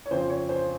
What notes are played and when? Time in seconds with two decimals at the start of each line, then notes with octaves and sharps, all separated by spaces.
0.06 C#5
0.11 F2 C#3 F3 C5
0.30 C#5
0.49 C5